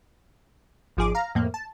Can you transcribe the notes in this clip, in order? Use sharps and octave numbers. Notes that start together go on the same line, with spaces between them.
G#1 F3 G#4 D6
F5 A#5
F2 A2 A#3
A5